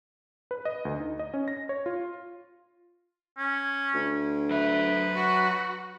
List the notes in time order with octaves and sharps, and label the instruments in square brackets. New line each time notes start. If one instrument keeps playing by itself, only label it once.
[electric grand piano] B4
D#5
D2
D#4
D#5
C#4
A#6
C#5
F4
[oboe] C#4
[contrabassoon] D2
[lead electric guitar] F#3 E5 [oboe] B4
[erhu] F#4